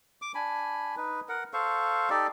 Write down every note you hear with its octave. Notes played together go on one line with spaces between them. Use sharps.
D6
D4 G#5 B5
D#4 B4
A#4 F#5
A4 C5 F5 C#6
D#4 G4 A4 D5